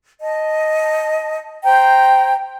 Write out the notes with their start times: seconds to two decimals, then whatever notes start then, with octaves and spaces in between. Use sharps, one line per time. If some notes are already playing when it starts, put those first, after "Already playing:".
0.21 D#5 A5
1.63 C5 G5 A#5